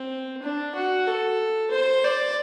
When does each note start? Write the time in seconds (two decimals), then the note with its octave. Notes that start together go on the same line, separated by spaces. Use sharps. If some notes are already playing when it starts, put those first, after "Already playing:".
Already playing: C4
0.42 D4
0.75 F#4
1.07 A4
1.71 C5
2.04 D5